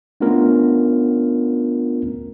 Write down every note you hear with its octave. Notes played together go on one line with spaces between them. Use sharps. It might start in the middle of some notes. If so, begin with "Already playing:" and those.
A3 B3 C#4 D4 F4 A#4